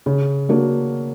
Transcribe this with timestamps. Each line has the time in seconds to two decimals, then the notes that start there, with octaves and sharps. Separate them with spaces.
0.06 C#3
0.49 F#3 A#3 D4